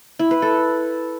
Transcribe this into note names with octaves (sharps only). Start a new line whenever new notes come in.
E4
B4
A4